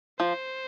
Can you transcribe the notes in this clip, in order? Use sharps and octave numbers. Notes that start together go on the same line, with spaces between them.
F3 C5